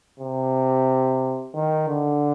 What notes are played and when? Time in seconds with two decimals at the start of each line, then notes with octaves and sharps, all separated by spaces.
0.20 C3
1.55 D#3
1.89 D3